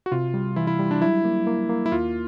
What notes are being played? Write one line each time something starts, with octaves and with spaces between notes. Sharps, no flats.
F#4
C3 F4
G3
E3 E4
E4
G3
D4
F#3 E4
A#3
A#3
A#3
E4
D#2 F4